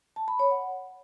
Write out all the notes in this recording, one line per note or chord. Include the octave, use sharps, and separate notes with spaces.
A5
B5
C#5
F#5